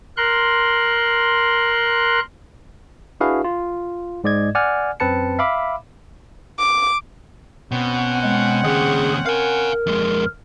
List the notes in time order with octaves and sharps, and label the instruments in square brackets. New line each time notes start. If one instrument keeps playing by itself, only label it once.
[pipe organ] A#4 C6 F#6
[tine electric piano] D4 E4 F#4 G#4 B4 F5
F4
G#2 G#3 D5 D#5 G#6
D5 F#5 G#5 F6
F#2 C4 B4 A5 C#7
E5 F5 B5 D6
[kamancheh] D6
[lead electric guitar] B2 [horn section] C4 C#4 F#5
[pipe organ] G#3
[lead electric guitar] D#2 C#3 [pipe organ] G#4
[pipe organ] A#4 [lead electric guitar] F5 G#5
[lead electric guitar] F2 G#3